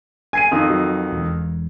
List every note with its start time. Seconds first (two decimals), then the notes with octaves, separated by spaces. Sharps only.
0.33 G#5 G#6 C7 D#7
0.51 F2 D#3
0.69 F#3
1.11 E1